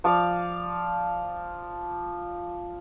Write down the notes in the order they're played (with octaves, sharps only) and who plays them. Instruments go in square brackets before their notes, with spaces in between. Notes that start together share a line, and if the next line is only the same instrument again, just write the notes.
[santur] F3 D5 F5